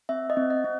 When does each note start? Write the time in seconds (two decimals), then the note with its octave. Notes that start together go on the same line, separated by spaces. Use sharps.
0.09 C4 E5
0.30 D#5
0.37 C4
0.50 D#5
0.65 C4